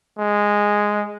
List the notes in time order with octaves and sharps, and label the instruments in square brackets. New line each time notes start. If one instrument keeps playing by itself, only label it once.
[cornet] G#3